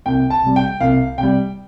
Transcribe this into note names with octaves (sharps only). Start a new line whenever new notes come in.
C2 G5
A5
C3 G3
G5
C2 F5
C3 G5
G3